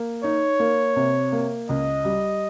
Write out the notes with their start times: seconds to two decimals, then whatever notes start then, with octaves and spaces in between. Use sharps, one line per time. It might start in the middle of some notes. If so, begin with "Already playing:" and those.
Already playing: A#3
0.23 D#4 C#5
0.60 A#3
0.96 C3
1.32 A#3
1.69 C#2 D#5
2.05 G3